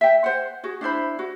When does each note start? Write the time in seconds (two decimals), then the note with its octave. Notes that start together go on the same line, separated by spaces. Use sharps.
0.01 E5 G5
0.24 C5 F#5
0.63 F#4 G#4
0.81 D4 E4 C5 B5
1.19 F#4